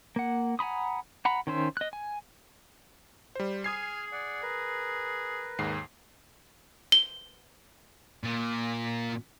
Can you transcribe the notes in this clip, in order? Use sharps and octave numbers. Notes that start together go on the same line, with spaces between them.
A#3 F#5
F#5 G#5 A#5 B5 D#6
F#5 A#5 B5
D#3 C#4 C5 E5
D#5 F#6
G#5
G3 C5
G#4 G#5 D#6 F6 G#6 C7
D5 F#5
A#4 B4
D#2 G#2 C7
G7
A#2